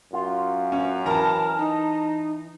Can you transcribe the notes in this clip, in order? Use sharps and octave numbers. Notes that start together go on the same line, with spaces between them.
F#2 F4
C#4
E3 A#4 A5 A#5
D#4